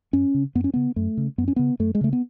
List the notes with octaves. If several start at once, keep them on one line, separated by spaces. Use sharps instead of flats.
F#2 C#4
C#3
F#2 B3
C#4
C#3 B3
F#2 A3
C#3
F#2 B3
C#4
C#3 B3
F#2 A3
G#3
C#3 A3
B3